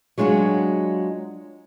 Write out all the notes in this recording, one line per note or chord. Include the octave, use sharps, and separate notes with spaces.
F#3 G#3 D4 F4 F#4